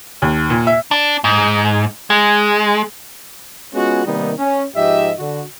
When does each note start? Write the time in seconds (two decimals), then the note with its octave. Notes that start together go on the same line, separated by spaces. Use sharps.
0.22 D#2
0.50 A#2
0.67 E5
0.91 D4
1.24 G#2
2.10 G#3
3.75 G#3 B3 C#4 F4 F#4
4.06 C3 D#3 G3 A#3 B3 D#4
4.39 C#4
4.76 G#2 F3 G4 D#5 E5
5.20 D3 F#4